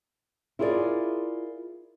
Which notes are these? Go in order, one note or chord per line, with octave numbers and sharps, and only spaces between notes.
E4 F4 G#4 A#4 B4 D5